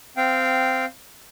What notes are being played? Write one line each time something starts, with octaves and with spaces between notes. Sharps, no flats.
C4 F5 G5